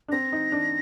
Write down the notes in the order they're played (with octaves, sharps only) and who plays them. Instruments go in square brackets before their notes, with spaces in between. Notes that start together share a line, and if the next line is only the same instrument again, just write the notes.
[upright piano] D4
[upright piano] C4 [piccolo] A#6
[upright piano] D#4
D4